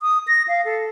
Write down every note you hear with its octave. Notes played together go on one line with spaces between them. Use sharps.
D#6
A#6
F5
A4